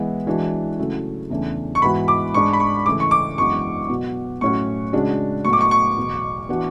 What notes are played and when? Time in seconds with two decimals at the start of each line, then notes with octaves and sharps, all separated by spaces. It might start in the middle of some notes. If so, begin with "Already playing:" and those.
Already playing: E3 G#3 B3 E4
0.27 E3 G#3 D4 F#4
0.78 C#3 F#3 A3 E4
1.30 E2 C#3 E3 A3 D4
1.75 C#6
1.82 G#2 E3 B3 F#4 B5
2.08 D6
2.34 G#2 G#3 D4 C#6
2.53 B5
2.60 C#6
2.86 C#3 E3 A3 E4 D6
3.00 C#6
3.11 D6
3.38 F#2 E3 G#3 B3 D4 C#6
3.89 B2 F#3 B3 F#4
4.41 A2 F#3 C#4 F#4 C#6
4.93 C#3 G#3 D4 F#4
5.45 A2 F#3 B3 C#6
5.53 D6
5.61 C#6
5.71 C#6
5.97 E2 B2 F#3
6.49 E3 B3 D4 F#4